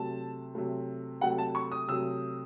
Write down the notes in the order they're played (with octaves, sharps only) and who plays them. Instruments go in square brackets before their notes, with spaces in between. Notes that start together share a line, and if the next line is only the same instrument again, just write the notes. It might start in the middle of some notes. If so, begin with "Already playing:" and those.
Already playing: [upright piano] C3 F#3 A3 A5
C3 F#3 A3
C3 F#3 A3 F#5
A5
C#6
D#6
C3 F#3 A3 E6